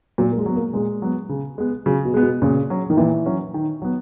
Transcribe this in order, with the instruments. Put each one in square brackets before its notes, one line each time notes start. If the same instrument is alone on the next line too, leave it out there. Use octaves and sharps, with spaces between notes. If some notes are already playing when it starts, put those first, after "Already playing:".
[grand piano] A#2 [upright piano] F#3
[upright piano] A#3
G#3
[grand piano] F#3 B3
[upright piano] A#3
[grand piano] A#2 [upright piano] G#3
[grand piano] F#3 B3
C#3
G#3 B3
[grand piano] C#3 [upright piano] F#3
[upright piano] B2
[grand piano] G#3 B3
[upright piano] B2
[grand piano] A#2 [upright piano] C#3
[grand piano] F#3 C#4
[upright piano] D#3
[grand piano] A#2 [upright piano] E3
[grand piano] F#3 C#4
D#3
F#3 B3